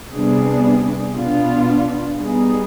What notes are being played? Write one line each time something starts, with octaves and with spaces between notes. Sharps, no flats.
C3 G3 B3 D4 G#4
B2 B3 D4 F4
G3 B3 D#4 G#4